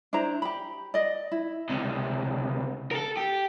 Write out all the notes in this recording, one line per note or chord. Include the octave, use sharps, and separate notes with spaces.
D4 E4 C5 A#5
G4 B5
D5 D#5
E4
C#2 C3
A4 A#4
G4